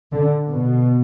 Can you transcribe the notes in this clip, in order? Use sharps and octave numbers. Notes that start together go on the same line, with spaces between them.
D3
B2